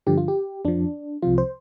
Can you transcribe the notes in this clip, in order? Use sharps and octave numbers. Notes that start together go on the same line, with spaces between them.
G2 D3 F3 G4
F4
G4
F2 F3 D4
C2 C3 F3 F4
C5